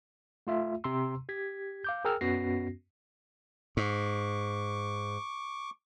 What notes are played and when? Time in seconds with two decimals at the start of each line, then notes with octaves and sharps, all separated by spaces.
0.47 A3 F4 E5
0.84 C3 A#5 C6 E6
1.29 G4 G#6 B6
1.84 F5 D6 G6
2.05 G#4 A#4 G5 E6 F6
2.21 F#2 B3 C#4 F#4 A#6 C7
3.77 G#2 C#6 D6